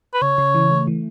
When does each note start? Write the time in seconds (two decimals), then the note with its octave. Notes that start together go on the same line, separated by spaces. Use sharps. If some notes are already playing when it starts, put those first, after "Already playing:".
0.14 B4
0.22 C#3 C#5
0.38 C#3
0.55 E3
0.71 A3
0.87 E3